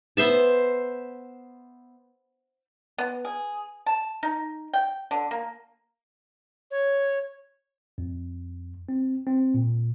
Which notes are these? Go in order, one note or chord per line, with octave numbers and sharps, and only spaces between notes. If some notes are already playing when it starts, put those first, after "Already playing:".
B3 C5 E5 A5
B3
G#4
A5
D#4
G5
D3
A#3
C#5
F2
C4
C4
A#2